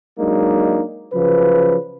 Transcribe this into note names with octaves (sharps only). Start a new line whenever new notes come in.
F#3 G#3 A#3 D4 D#4
C#3 F3 F#3 B4